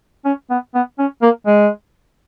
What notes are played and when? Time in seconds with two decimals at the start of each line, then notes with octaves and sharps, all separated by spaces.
0.25 C#4
0.50 B3
0.74 B3
0.99 C#4
1.22 A#3
1.47 G#3